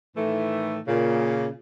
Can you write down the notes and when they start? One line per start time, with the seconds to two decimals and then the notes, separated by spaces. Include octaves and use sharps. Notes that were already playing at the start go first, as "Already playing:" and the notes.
0.16 A2 D#3 E3 A3
0.87 A#2 C#3